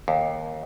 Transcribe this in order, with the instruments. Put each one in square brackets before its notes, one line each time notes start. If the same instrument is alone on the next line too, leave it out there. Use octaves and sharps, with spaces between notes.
[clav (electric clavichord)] D#2